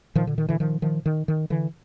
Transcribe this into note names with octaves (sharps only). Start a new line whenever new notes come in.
A#2 D#3 F3
D3
D#3
D3 E3
D#3 F3
D#3 F3
D#3
D#3
D3 E3